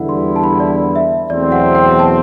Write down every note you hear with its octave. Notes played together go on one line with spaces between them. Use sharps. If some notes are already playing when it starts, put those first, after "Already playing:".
Already playing: E2 D3 G3 B3 E4 F#5
C6
A5
B5
D5
E5
E2 B2 F#3 A3 C4 D5
F#5
G5
A5